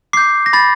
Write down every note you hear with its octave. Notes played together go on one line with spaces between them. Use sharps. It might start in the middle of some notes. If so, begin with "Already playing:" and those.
D6 G6 C7
A#6
B5 A6